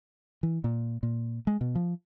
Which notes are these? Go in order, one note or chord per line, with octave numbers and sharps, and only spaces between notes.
E3
A#2
A#2
G#3
B2
F3